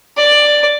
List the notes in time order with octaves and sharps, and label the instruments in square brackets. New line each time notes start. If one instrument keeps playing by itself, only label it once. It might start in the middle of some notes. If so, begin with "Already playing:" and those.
[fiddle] D5